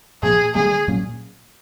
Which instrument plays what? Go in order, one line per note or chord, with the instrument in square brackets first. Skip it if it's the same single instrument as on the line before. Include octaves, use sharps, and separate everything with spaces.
[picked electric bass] A#2 F3 A#3 [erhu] G#4
[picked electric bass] D3 G3 A#3 [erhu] G#4
[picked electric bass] A#2 F#3 A#3 C#4